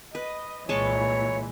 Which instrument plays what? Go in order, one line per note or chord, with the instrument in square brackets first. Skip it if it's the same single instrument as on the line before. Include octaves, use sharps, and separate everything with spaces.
[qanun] B4 [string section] D#5
[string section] C2 A#2 E3 [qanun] G#3 A5 C#6 [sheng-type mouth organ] C#5